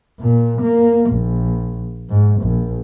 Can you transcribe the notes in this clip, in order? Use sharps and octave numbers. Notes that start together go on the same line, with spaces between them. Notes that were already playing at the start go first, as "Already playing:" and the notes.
A#2
A#3
A#1
G#2
A#1